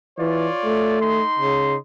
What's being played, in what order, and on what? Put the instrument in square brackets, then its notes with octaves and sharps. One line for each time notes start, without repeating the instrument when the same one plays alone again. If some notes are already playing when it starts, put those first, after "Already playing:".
[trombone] E3 [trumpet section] F4 C#5 D5
[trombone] A3
[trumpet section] D#4 C6
[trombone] C#3